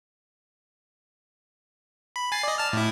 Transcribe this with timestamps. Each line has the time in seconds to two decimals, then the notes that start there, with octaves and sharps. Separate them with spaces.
2.16 B5
2.32 G#5 A6 C7
2.43 D5 D#5
2.58 A5 F6
2.73 A2 E4